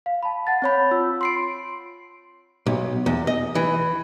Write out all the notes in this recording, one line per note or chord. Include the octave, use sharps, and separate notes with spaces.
F5
A5 B5
F#5 A5 A6
C4 C#5 B5
F4 E6
C6 C7 D7
B1
E2
D#5
E3